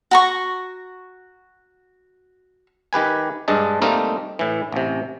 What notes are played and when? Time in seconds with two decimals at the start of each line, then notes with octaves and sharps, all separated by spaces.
0.11 F#4 A#5 C#6
2.93 D#3 G4 B4 G#5
3.48 G2 G#3 D4 D#5 A5
3.82 G3 A3 A#3 C4 D#4 A#4
4.39 A2 E3
4.72 A1 C3